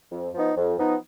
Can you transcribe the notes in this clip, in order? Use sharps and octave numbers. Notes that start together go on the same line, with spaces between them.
F2
F3 B3 D#4
F2
F3 B3 D#4